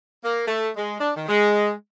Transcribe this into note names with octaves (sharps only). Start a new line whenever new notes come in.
A#3
A3
G#3
D4
D#3
G#3